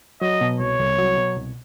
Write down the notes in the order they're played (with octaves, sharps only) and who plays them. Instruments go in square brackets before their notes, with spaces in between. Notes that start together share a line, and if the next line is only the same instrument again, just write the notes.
[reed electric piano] F#3 [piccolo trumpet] D#5
[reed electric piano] B2
[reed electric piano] C2 [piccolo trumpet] C#5
[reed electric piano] C2
F#3
B2
C2